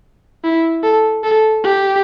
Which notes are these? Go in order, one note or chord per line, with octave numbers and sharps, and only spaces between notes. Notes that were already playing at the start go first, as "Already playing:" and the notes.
E4
A4
A4
G4